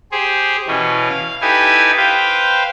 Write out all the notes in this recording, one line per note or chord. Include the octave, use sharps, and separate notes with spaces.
G4 G#4 C5
B2 E3 C#4
F5
D#4 E4 G4 A4 B4 G#5
B4 C5 F5 G5